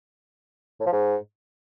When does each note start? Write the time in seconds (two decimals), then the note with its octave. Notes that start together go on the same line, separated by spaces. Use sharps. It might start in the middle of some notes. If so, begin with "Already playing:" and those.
0.80 A2
0.86 F3
0.92 G#2